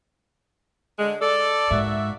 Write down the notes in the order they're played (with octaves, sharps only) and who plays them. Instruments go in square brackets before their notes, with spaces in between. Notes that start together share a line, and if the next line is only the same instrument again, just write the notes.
[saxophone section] D3 G#3
[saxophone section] A4 [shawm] D5
[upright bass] G#2 [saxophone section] A#3 F#4 E5